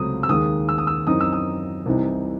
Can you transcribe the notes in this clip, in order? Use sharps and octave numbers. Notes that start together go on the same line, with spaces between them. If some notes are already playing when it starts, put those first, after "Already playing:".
Already playing: C#2 C3 F#3 A3 C4 D#6
E6
D#2 D#3 G#3 D#6
E6
D#6
E6
F#2 E3 C4 D#4 D#6
E6
D#6
C2 C3 E3 C4 D#4